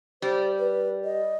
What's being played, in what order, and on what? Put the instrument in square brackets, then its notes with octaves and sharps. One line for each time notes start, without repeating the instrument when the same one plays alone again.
[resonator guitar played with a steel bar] G3 [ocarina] C5
[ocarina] B4
D#5